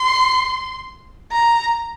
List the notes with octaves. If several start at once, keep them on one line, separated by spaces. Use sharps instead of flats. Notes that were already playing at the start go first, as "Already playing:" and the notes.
Already playing: C6
A#5